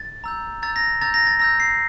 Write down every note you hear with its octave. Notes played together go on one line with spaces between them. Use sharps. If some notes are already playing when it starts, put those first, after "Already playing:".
Already playing: A6
A#5 E6 G6
A#5 E6 G6 A6
A#6
A#5 E6 G6 A6
A#6
A6
A#5 E6 G6 A#6
C7